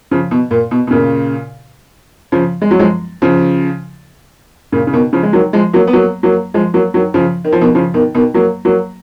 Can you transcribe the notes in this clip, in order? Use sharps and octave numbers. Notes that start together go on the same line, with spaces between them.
C#3 F3
B2
A#2
B2
B2
A#2 C#3
C#3 F3
G#3
F#3
F3 G#3
C#3 F3
A#2 C#3
C#3
B2 D#3
C#3 F3
G#3
D#3 F#3
F3 G#3
F#3 A#3
B3
F#3 A#3
F#3 A#3
F3 G#3
F#3 A#3
D#3 F#3
C#3 F3
D#3
F3
B2 D#3
C#3 F3
B2 D#3
B2 D#3
F#3 A#3
F#3 A#3